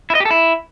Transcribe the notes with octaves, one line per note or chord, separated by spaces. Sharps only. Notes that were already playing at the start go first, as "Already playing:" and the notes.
E4
D#5
G4
A4
E4